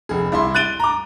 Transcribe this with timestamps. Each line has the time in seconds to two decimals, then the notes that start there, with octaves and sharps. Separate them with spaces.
0.09 F1 G#4
0.32 C2 E4 E5 C6
0.54 F#6 A6 D7 D#7 G7
0.80 A#5 D6